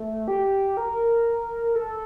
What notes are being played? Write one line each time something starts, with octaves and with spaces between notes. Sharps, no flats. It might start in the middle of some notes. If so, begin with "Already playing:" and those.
Already playing: A3
G4
A#4
A4